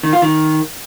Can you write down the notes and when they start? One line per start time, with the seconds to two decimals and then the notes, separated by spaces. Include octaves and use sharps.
0.03 D#3
0.13 F4
0.22 D#3